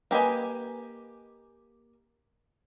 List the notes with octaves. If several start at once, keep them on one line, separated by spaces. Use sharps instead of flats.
A#3 G4 B4 D#5 G#5